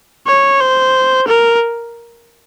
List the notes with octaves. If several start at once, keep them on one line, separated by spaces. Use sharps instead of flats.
C#5
C5
A#4